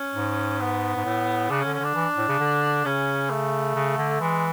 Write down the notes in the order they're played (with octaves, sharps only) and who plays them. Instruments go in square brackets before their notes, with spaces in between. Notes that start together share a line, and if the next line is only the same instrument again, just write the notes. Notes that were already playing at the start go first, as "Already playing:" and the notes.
Already playing: [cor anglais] C#4
[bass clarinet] G#2
[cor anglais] B3
[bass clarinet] G#2
A2
[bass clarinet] C#3 [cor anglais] D4
[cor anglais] C#4
[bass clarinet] D3
[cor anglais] C#4
[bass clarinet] D3 [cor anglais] D4
[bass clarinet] E3
A2
C#3
D3
[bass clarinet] C#3 [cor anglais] C#4
[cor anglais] A3
[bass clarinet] C#3
D3
[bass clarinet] E3 [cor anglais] G#3